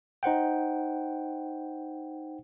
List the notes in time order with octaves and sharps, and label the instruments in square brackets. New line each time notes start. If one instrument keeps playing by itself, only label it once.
[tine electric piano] D#4 C5 F#5 G5